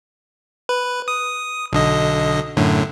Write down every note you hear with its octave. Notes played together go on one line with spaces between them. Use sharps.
B4
D#6
B1 D3 D#5
F#2 A2 D3